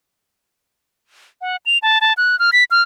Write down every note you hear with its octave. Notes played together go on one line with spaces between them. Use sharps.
F#5
F7
A5
A5
F#6
F6
B6
F6